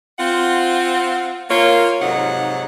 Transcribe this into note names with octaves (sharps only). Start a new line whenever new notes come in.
C4 F4 F#5
A#3 F4 C#5
F2 G#2 C3 F#3 D#4 F#5